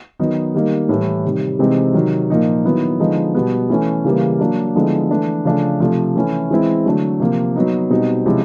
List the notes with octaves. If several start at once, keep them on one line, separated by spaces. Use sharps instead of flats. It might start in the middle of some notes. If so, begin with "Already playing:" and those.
D#3 F#3 B3 D#4
D#3 G3 A#3 D#4
A2 E3 G3
C3 D#3 G3
C3 E3 G#3 C4 D#4
C3 D#3 F#3
A#2 F3 A#3 D#4
D#3 F#3 B3 E4
D3 F3 G#3 B3 D#4
B2 G3 B3
E3 A3 C#4 E4
C#3 E3 G3 A#3
F#3 A#3 D4
D3 F3 G#3 B3 E4
E3 A3 D4
C#3 F3 A3 D4
C3 F3 A3
E3 A3 C#4 E4
E3 G#3 C4 E4
D3 F#3 A3 D4
C3 F3 A#3
F#3 B3 D#4
B2 G3 C4 D#4
C3 F3 G#3 C#4 E4